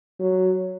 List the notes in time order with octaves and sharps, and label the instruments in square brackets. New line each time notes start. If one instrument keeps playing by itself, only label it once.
[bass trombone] F#3